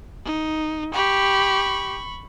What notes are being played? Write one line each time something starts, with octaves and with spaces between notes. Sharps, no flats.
D#4
G4 B5 C#6